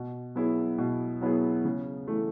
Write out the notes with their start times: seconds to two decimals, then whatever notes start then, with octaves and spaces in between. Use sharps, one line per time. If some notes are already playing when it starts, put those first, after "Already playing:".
Already playing: B2
0.35 F#3 B3 E4 G#4
0.78 B2
1.21 F#3 B3 E4 G#4
1.65 C#3
2.08 E3 A3